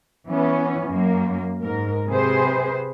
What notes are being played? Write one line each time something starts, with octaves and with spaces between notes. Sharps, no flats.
E3 B3 C#4
F#2 A#3
G#2 A#4
C3 G#4 B4 C5